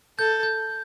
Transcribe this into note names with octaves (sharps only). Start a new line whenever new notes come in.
A4 G6
G6